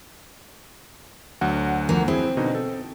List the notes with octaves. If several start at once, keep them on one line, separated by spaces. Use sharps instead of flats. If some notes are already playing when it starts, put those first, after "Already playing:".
D2 F#3 F#5
F3 A#3
C4 E4 G#4
B2 D3 D#4
A4